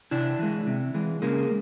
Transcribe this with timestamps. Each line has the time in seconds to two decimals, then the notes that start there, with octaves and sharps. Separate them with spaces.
0.11 C3 D4 E4
0.39 E3 G#3
0.67 C3
0.94 E3 G#3
1.22 C#3 G#3 A#3